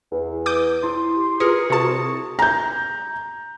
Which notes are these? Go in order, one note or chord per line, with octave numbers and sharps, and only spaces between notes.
E2
D6 D#6 G6
E4 C6
G4
F4 G#4 A#4 B4 C#7
C2 C3 F#4 A5 C#7
A#5 G6